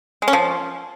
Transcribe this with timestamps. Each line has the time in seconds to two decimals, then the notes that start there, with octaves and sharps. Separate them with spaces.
0.22 G#3
0.28 C#4
0.33 F3